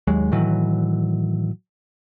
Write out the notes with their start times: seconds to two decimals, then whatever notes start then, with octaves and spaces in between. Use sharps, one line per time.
0.07 D#2 F#3 G#3
0.32 A2 D#3 E3 F#3